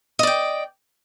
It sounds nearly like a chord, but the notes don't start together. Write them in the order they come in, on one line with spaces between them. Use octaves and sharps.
D#5 D5 G5